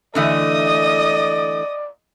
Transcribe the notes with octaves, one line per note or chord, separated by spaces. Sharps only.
D3 E3 A3 D5 D#5 D#6